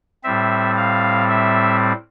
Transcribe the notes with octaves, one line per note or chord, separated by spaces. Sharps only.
A2 G3 C4 E5
F5
E5